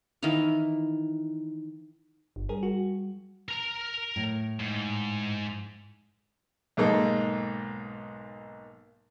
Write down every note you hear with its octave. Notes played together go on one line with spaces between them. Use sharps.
D#3 E3 E4 F5
G1
G3 G#4 A#4
F#4
A#4 A#5
A2
G#2
B1 G#2 A#3 D#4 A4